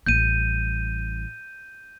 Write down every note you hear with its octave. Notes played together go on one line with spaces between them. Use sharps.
A1 G3 G6 D#7